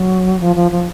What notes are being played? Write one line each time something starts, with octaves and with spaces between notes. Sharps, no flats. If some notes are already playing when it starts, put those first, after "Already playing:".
Already playing: F#3
F3
F3
F3